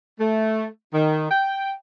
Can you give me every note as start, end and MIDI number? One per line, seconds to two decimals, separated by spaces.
0.20 0.65 57
0.93 1.31 51
1.31 1.72 79